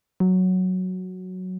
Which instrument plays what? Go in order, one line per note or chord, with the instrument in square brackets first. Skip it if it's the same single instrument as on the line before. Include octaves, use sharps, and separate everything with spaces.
[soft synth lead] F#3